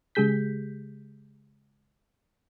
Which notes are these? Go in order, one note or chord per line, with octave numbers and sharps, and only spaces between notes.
C#3 G#3 G4 G#4 G6 B6